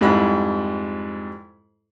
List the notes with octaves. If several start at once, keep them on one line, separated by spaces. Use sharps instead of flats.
F2 G#2 G3 E4 B5